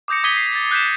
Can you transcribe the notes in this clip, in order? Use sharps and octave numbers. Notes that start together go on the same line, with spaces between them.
D6 D#6 G6 A#6 C#7
D6 D#6 G#6 B6 D#7 G7
C7
A6
F#6 G6 A6 B6 E7